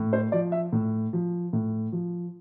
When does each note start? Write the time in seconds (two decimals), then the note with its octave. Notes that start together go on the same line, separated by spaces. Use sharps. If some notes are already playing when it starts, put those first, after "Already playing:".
Already playing: A2
0.13 C5
0.32 F3 D5
0.52 E5
0.73 A2
1.13 F3
1.53 A2
1.92 F3